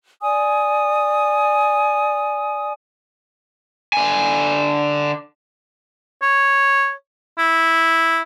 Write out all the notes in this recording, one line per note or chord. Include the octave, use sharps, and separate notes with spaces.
D5 G#5 D#6
D3 G#5
C#5
E4